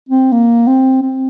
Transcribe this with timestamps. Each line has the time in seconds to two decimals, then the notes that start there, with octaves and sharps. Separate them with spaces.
0.09 C4
0.32 A#3
0.68 C4
1.02 C4